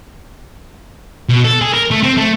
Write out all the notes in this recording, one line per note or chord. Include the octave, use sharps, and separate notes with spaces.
B2
A4
G#4
A#4
A3
C4
A3